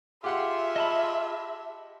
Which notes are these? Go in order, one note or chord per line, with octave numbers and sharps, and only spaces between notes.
F4 G4 G#4 E5 F#5 C6
D#5 A5 B5